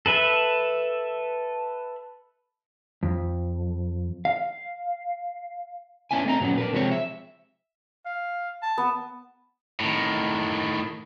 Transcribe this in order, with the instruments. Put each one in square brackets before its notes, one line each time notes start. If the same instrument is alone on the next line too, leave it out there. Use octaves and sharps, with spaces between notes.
[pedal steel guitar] A4 B4 E5
[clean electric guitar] F2
F5
[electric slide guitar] B3 C#4 D4 E4 G#5
A3 C4 D#5 A#5
A#2 F#3 B3 C#4 F#5
D4 A#4 B4
C3 F3 G#3 C4 D4 C#5
E5
[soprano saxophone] F5
A5
[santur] B3
[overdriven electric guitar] A2 D#3